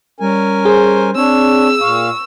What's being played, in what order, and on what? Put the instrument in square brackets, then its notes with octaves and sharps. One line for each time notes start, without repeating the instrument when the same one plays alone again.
[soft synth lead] G3 [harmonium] C#4 A#4 G#5
[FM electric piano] G#4 [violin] C5
[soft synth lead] C4 [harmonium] D4 C#5 [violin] E6
[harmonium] A#2 F5 [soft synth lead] C#6